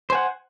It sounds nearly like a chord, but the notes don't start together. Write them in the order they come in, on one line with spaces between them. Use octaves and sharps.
C5 G#5 F#5